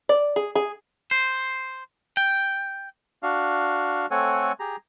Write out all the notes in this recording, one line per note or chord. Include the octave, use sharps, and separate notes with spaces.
D5
G#4
G#4
C5
G5
D4 F#4 F5
A3 C4 A4 C#5 F#5 G#5
G4 G#4 A#5